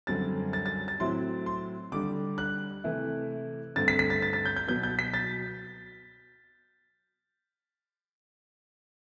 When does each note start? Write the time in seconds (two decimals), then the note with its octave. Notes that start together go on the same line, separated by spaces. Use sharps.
0.07 F#2 D3 G3 C4 A6
0.53 A6
0.66 A6
0.88 A6
1.00 A2 F#3 C4 E4 C6
1.46 C6
1.92 D3 G3 D4 D6
2.38 F#6
2.84 C3 E3 A3 E4
3.76 G2 D3 A3 C4 A6
3.88 B6
3.99 B6
4.10 A6
4.22 A6
4.33 A6
4.45 G6
4.56 G6
4.68 B2 F#3 B3 G6
4.83 G6
4.99 B6
5.14 A6